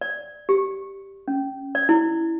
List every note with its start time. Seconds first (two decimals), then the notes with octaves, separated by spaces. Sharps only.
0.01 D5
0.49 G4
1.28 C#4
1.75 D5
1.89 E4